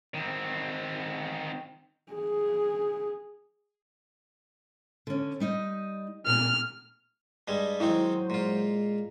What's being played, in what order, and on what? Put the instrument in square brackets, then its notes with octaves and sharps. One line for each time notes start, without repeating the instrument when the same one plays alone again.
[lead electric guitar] D#3 C4
[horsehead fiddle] G#4
[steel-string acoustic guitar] D3 C#4
G3 D#4 D#5
[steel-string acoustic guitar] A#2 [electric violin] F6
[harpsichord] G2 G3 G#3
[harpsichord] D#3 G#3 C4 [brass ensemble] F#3 C5 [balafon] E4
[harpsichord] A#2 F4 [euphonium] G#3